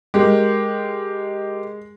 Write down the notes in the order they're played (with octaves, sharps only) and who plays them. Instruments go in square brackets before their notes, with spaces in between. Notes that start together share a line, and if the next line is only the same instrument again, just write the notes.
[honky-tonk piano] G#3 [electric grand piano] G4 A#4